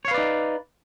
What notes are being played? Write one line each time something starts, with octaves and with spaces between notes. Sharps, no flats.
D#4 B4 C#5 D5 F5